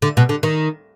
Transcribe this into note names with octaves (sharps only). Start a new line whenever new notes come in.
D3
B2
D3
D#3